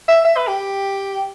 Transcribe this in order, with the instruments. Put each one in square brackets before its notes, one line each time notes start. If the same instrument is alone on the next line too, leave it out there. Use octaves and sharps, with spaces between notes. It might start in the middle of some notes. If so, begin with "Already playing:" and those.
[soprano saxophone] E5
E5
B4
G4